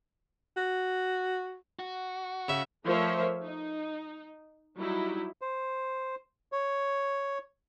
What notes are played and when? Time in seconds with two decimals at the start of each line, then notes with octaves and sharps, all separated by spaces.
0.57 F#4
1.79 F#4
2.49 C#3 E5
2.84 F3 A3 A#4 C5 C#5 E5
3.43 D#4
4.76 F#3 G3 D#4 E4
5.42 C5
6.52 C#5